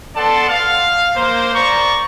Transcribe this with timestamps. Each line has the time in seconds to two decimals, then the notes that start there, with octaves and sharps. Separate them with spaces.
0.16 B3 A4 D5 F#5 A5 C6
0.49 F5
1.16 A#3 C5
1.54 D5 A#5 C#6